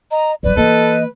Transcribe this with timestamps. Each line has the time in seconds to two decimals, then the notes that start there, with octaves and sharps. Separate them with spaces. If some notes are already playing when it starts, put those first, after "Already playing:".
0.11 D#5 A#5
0.43 G1 F#3 B4 D5
0.57 E3 A#3 A4 D#5